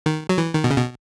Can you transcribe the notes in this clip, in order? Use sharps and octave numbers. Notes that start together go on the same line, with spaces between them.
D#3
F#3
E3
D#3
B2
C#3
B2